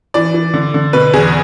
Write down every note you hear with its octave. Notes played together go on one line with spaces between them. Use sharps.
E3 D5
E3
D3
D3
B2 B4
E2 G#4